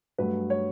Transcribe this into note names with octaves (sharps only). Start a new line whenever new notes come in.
G2 F#3 A3 B4
C#5